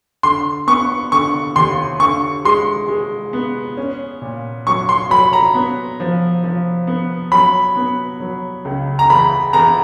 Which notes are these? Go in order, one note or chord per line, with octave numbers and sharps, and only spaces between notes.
D3 C6
B3 C#6
D3 C#6
D#2 C6
D3 C#6
G#3 C6
G#3
B3
C#4
A#2
F#3 C#6
C6
F#3 B5
A#5
B3
F3
F3
B3
F#3 B5
B3
F#3
C#2
A#5
E2 B5
E2 A#5